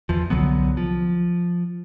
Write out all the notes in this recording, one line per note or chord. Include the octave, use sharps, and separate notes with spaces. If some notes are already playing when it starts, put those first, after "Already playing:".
E2 F3
C2 D3 F#3 B3
F3